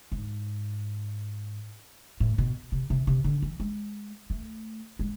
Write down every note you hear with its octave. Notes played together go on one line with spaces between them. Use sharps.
G#2
A2
B2
C3
C3
C3
D3
E3
G#3
A3
G#3